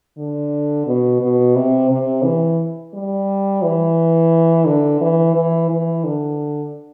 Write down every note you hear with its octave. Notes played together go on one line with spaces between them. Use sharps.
D3
B2
B2
C3
C3
E3
G3
E3
D3
E3
E3
E3
D3